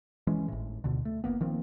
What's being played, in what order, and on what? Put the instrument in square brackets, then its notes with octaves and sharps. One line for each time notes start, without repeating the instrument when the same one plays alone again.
[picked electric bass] E3 G#3 C#4
G#1 A2
D2 B2 D3
A3
G1 E2 A#3 B3
D#3 F3 A#3 C4